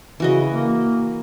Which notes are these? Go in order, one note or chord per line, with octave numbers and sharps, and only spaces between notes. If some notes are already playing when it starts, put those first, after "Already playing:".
C#3 E3 F#4 D#5
A#3